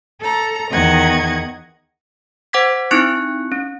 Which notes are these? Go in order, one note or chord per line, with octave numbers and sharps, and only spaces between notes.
A4 A#5
E2 D#3 D#5 F#5 G#6
C5 F#5 D6 G#6 B6
C4 D#4 E4 C#6 F#6 C#7
C#4